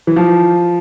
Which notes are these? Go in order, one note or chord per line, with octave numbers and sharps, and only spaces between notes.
E3
F3